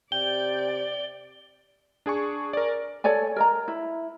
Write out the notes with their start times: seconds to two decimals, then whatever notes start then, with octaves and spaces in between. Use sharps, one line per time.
0.12 C3 D5 G5 G7
2.06 D4 G#4 G#5 C#6
2.53 A#4 D5
3.04 A4 C#5 D5 G#5
3.36 A#4 D#5 A#5
3.68 E4